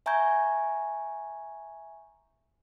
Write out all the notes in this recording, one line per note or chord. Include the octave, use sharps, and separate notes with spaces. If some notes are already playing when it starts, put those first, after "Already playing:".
E5 G#5 A#5 C#6 G6 G#6